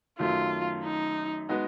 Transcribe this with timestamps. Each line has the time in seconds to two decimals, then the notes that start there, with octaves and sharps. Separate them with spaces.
0.19 F#2 D#3 F#3 A3 F4
0.84 D#4
1.49 G#3 B3 D#4 F#4 B4